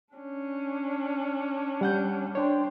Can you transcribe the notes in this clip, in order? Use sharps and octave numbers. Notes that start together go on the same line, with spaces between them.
C#4 D4
G3 F#5 G6
D4 C5 C#5 G5